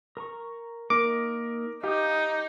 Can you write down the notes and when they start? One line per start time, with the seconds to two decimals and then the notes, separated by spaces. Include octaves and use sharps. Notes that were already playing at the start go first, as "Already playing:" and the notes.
0.17 A#4 A#5 C#6
0.90 A#3 D#4 A#4 D6
1.83 D#4 G4 F5 G5 D#6